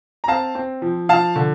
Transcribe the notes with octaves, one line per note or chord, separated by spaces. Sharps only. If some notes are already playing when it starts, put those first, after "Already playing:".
A#5
C4 F5 A5
C4
F3
F3 F5 A5
D3